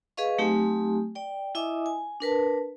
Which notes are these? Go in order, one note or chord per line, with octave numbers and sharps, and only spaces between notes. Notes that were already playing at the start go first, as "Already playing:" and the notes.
G#4 B4 D#5 F5 C#6
F#3 A3 C4 D#4 G4 G#5
D5 G5
E4 D#5 E5 G#5 D6 D#6
G#5
D4 A#4 B4 A5